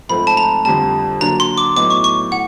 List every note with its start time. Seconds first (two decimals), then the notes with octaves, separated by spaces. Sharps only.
0.09 G#2 F3 A3 C4 B5
0.27 A5
0.37 A#5
0.65 F2 D3 G3 A5
1.21 D3 F#3 A#3 D4 F#4 A#5
1.40 C6
1.58 D6
1.76 A2 F#3 B3 D#4 D6
1.90 C#6
2.04 C#6
2.32 A2 F#5